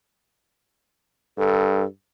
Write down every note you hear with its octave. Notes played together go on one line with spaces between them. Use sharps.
G2 A4